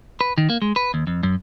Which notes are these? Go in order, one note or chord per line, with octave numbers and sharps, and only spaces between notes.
B4
D#3
A#3
G#3
B4
D#2
F2
F#2